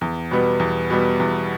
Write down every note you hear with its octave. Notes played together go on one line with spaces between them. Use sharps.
E2
B2 G3 B3
E2
B2 G3 B3
E2